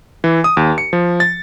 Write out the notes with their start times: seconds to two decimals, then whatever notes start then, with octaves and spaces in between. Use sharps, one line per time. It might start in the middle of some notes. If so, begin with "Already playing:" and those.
0.24 E3
0.44 D#6
0.57 D#2
0.78 C#7
0.93 F3
1.20 A6